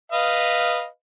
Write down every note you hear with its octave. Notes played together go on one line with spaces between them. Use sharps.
B4 D#5 F5